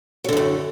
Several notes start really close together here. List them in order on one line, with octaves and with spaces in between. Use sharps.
F#3 D3 F#2 A2